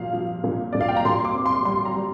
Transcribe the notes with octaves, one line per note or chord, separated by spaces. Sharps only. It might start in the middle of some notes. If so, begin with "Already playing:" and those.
Already playing: A#2 F3 F5
F3
A#2
A#2 D5
F5
G5
A#5
A#2 C6
D6
C4
C6
G3 C6
A#5
G3